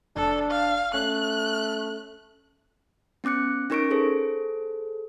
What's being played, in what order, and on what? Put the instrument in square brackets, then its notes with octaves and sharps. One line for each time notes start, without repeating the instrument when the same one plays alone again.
[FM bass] F1 [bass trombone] D4 [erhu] A4
[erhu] F5
[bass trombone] A3 [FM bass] C#4 [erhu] F#6
[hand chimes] B3 C#4 D6 F#6 C#7
C#4 D#4 A#4 C#6 A#6 D7
G#4 A4 C5